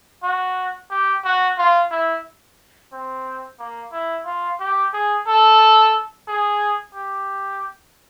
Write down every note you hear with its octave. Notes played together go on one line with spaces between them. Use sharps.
F#4
G4
F#4
F4
E4
C4
A#3
E4
F4
G4
G#4
A4
G#4
G4